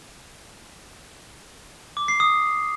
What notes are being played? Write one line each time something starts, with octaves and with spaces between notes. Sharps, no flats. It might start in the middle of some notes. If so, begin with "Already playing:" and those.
D6
C7
D#6